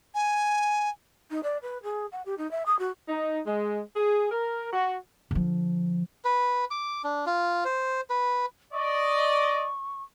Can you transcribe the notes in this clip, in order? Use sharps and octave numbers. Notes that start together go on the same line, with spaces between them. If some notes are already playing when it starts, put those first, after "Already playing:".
G#5
D#4
D5
B4
G#4
F#5
G4
D#4
E5
D#6
F#4
D#4
G#3
G#4
A#4
F#4
D3 F3
B4
D6
D4
F4
C5
B4
D5 D#5 C#6